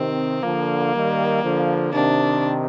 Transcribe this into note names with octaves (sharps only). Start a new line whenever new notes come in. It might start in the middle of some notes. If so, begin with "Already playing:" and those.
Already playing: C3 D#3 C4
D3 F3 A#3
D#3 G3
D3 F3
C3 D#3 D4